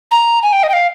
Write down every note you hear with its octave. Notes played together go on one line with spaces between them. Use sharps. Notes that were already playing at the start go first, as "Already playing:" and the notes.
A#5
G#5
G5
D#5
G5
F5